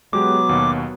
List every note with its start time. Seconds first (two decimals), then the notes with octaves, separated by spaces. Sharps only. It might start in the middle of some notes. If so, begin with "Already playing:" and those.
0.13 F#3 G#3 B3 G4 D6
0.49 D#2 B2